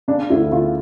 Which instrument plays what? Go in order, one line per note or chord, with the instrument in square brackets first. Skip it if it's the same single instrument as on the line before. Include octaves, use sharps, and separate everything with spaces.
[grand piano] C#3 [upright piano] D4
[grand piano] D2 [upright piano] E4
[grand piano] C#3 [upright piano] F4